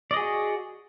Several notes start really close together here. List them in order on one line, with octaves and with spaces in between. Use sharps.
D5 D#5 G#4 F#4